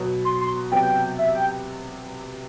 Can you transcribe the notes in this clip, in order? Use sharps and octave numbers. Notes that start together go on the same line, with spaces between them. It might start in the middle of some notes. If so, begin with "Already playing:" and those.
Already playing: B2 F#3 B3
C6
C6
C3 F#3 B3 G5
E5
G5